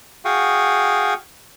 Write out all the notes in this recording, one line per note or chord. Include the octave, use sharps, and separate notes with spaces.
F#4 G#4 F5 G5 C#6 D#6